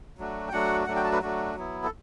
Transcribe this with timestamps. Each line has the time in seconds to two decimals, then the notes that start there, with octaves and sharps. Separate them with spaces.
0.18 F#3 A3 D4 F#4
0.48 G5
0.53 F#3 A3 D4 F#4 F#5
0.87 F#3 A3 D4 F#4 F#5
0.96 G5
1.04 A5
1.12 B4
1.22 F#3 A3 D4 F#4
1.55 F#3 B3 E4
1.84 A4